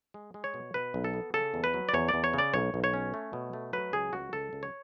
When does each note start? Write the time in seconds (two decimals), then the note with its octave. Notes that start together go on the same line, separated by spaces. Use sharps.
0.14 G#3
0.34 G#3
0.44 C#5
0.54 B2
0.74 B2 B4
0.94 B1
1.04 A4
1.14 B3
1.34 C#3 A4
1.54 E2
1.64 B4
1.74 F#3
1.89 D5
1.94 E2 C#5
2.09 D5
2.14 E2
2.24 C#5
2.34 C#3 D5
2.54 B1 C#5
2.74 B1
2.84 C#5
2.94 C#4
3.14 A3
3.33 B2
3.53 A3
3.73 F#3 B4
3.93 C#2 G#4
4.13 C#2 F#4
4.33 C#2 A4
4.53 C#2
4.63 C#5